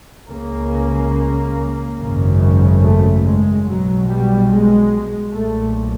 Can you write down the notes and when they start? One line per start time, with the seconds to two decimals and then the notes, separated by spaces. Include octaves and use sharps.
0.29 C#2 C#3 A#3
1.98 G#1 F#2 C#3
2.81 A3
3.24 G#3
3.65 B1 B2 F#3
4.07 G3
4.49 G#3
5.33 B1 A#2 A3